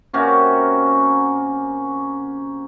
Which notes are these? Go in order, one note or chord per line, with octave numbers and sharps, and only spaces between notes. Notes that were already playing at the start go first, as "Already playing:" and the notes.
C3 A#3 C#4 F#4